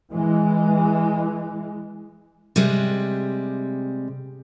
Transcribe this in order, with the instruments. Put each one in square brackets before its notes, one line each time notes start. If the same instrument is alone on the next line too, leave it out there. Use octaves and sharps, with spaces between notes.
[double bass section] E3 G#3
[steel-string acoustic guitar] C3 G3 G#3